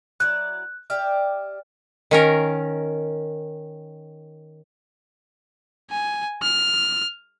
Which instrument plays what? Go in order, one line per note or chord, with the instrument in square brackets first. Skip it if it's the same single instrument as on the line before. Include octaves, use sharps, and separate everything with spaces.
[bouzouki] F#3 E4 D5 [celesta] F#6
[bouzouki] G4 D5 E5 [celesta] F6
[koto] D#3 C#4 A#4
[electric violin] G#5
F6